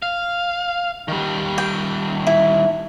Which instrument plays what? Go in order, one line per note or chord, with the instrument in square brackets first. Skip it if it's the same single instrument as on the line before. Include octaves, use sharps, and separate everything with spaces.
[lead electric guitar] F5
D#3 G3
[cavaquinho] G5
E4